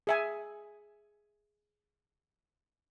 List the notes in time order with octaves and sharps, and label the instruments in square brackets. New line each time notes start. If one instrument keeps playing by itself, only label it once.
[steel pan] G#4 E5 G#5